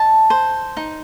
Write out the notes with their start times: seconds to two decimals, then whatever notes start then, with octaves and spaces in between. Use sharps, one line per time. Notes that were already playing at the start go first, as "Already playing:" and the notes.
Already playing: D#5 A5
0.30 C5
0.77 D#4